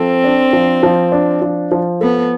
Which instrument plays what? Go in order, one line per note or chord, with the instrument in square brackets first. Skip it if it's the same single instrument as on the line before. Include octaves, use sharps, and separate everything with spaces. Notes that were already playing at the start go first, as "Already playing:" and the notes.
Already playing: [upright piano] F3 A4 [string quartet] C4
[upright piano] D4
F3
F3
D4
F3
F3
[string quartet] B3 [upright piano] A4